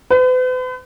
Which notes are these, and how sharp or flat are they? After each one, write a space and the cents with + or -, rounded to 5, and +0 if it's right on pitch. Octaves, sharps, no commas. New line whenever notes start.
B4 +45